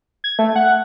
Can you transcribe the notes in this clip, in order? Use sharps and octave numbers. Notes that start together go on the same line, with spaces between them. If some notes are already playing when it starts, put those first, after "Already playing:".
G#6
A3
F#5